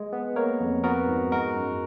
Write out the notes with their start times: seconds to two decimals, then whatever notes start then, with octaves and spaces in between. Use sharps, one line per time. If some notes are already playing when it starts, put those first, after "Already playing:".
Already playing: G#3
0.13 B3
0.36 A#3 A#4 C#5
0.60 F2
0.84 B3 F#4 A#4
1.08 G#2
1.32 G#3 F#4 A#4
1.55 F#2